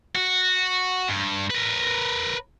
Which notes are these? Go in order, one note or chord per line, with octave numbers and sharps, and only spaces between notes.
F#4
G2
A#4 B4